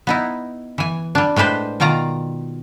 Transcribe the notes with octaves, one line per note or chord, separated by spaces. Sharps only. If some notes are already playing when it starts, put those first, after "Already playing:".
B3 D#4 E4
E3 G#5
G3 D4
A2 G#3 D4 B4 C5
B2 D#3 F4 D5 A#5